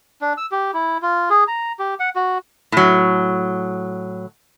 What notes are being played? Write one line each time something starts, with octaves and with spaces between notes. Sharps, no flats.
D4
E6
G4
E4
F4
G#4
A#5
G4
F#5
F#4
A2 F#3